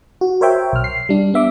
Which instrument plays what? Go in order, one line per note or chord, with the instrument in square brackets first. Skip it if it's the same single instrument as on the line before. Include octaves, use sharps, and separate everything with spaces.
[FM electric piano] F#4
A#4 C5 C#5 E5 G5
B1 F6
C7
G3 D4
B3 E5 D6